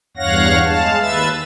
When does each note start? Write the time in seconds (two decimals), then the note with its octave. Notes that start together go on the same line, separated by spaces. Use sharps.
0.17 E2 G2 C#5 F5 F#5 A#6
0.65 G#3 F5 A5
1.00 D#2 B4 E5 E6 A6